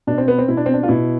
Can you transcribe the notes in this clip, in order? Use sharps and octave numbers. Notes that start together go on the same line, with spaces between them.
B2 D4
C4
B3
C4
B2 E4
D4
C4
D4
F4
B2 E4